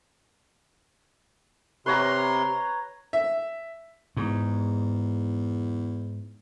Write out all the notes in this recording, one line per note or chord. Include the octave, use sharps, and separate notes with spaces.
C3 B4 C#5 A#5 C6
E5
E2 G#2